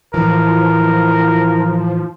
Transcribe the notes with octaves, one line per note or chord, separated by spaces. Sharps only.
A2 E3 F3 E4 A#4